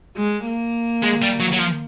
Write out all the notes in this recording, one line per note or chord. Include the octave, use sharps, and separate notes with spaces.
G#3
A#3
G#3
G3
F#3
F#3
F3